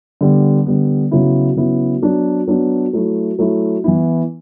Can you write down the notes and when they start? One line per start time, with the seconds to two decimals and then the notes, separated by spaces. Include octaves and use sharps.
0.21 D3 G3 B3
0.66 D3 G3 B3
1.11 C#3 F#3 B3 E4
1.56 C#3 F#3 B3 E4
2.02 F#3 B3 D4
2.48 F#3 B3 D4
2.93 F#3 A3 E4
3.39 F#3 A3 E4
3.84 E3 B3 E4